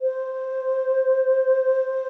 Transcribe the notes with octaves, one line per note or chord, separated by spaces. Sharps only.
C5